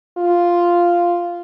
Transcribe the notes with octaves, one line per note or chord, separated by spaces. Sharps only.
F4